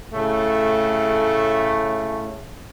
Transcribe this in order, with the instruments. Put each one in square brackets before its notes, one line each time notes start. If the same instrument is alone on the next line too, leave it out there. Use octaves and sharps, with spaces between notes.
[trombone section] A2 C#3 A3